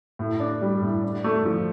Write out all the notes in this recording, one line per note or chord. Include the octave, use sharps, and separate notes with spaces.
A2
D4
G3
A2
D4
A3
F3